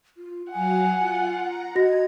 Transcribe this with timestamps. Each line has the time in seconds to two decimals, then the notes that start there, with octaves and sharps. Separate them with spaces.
0.17 F4
0.52 F#3 F5 F#5 G#5
0.97 F4
1.41 A#5
1.76 F#4 D#5 G#6 A#6